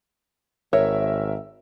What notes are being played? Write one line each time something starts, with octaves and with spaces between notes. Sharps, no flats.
G#1 A#4 C#5 E5 E6